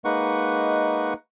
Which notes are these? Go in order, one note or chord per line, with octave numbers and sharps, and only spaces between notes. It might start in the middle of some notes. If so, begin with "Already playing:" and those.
G#3 A#3 D#4 B4 F#5 C#6